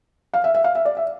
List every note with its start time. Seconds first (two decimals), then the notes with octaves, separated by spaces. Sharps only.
0.34 F5
0.44 E5
0.55 E5
0.64 F5
0.75 E5
0.85 D5
0.97 E5